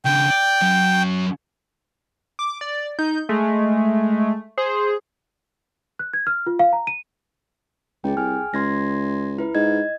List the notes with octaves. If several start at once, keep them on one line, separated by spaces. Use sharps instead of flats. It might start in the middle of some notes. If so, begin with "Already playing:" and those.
C#3 D4 G5
D5
F#3 C#4
D6
D5
D#4 G6
G#3 A3
G#4 C5
F#6
G#6
F6
F4
F5
A#5
D#7
C#2 G#4 G5
C2 G#5 F6
C#2 C6 G#6 A#6
E4 B4
G#2 D#5 G#6